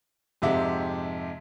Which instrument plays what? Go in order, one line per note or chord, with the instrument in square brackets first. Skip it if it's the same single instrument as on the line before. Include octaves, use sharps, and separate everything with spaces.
[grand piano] F2 G#2 C3 G4 E5 F#5